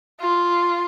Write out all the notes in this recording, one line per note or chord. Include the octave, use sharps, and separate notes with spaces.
F4